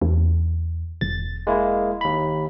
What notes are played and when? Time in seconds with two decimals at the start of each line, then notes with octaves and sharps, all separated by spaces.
0.02 E2
1.01 E1 A6
1.47 G#3 A#3 E4
2.01 D#2 B5